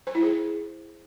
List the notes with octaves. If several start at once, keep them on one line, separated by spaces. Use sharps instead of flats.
C5
E4
G#4